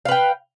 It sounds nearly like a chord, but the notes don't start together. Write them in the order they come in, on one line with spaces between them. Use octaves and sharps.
F5 B4 G5